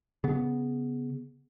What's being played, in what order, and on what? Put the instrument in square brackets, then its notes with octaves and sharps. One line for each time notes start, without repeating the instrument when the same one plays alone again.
[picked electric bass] C#3 B3